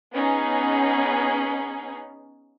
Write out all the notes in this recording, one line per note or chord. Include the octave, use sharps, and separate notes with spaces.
B3 C#4 D#4 G#4